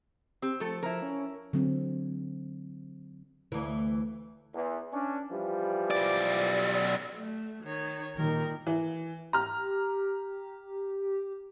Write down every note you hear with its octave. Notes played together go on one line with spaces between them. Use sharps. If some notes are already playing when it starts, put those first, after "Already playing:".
C4 G4
F3 A3 A4
F3 E4 A#4
C#4
D3 F#3 C4
D2 E3
E2
C#4 D4
E3 F3 G3
B1 D5
A3
D#3 C#5
A#2 D#3 G3 A#4
E3
G4 A#5 F6